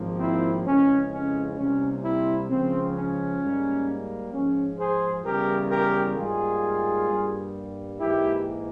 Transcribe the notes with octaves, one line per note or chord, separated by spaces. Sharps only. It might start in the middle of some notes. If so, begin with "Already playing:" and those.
Already playing: G#1 G#2 F3 A#3
C4 E4
F2 C#3 E3 G#3 C#4
C#4
C2 C3 G3 A#3 C#4
C4 E4
C#2 C#3 F3 C4
C#4
G#2 G3 A#3
G#2 F3 G#3 C#4
G#4 C5
E2 C#3 E3 G3 G4 A#4
G4 A#4
G#2 G3 A#3 F4 G#4
G2 G3 A#3
G#2 E3 A#3 E4 G4